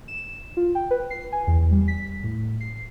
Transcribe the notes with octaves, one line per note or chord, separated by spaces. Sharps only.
E7
F4
G5
B4
C7
G#5
E2
G3
B6
A2
C7